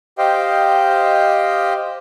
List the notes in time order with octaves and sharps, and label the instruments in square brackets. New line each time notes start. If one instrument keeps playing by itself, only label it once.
[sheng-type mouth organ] G4 C5 D#5 F5 G5